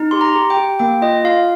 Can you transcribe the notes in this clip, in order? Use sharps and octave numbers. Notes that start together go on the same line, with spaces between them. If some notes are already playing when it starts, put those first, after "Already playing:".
Already playing: D#4
G4 C6
A#5
G4
G5
G4
A#3 G5
F4 D#5
F4 F5